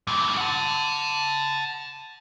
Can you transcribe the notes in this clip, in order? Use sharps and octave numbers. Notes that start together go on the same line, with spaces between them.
G2 A#2
F#5 A5